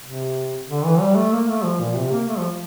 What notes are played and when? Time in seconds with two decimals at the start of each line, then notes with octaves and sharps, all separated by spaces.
0.04 C3
0.68 D3
0.85 E3
1.01 G3
1.16 A3
1.33 A#3
1.49 A3
1.64 F3
1.80 A#2
1.97 C3
2.12 A#3
2.28 A3
2.39 F3